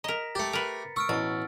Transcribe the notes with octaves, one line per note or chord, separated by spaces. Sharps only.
A#4 D#5 A#5 B6
A3 G4 A6 C#7
A#4 B4
C#6 E6 F6 D7
A1 B2 C#6 A6